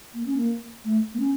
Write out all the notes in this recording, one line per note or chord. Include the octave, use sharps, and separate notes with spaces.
A#3
C#4
A#3
A3
A#3
C#4